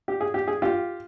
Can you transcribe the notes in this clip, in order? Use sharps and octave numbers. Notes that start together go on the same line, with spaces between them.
G4
G#4
G4
G#4
F4 G4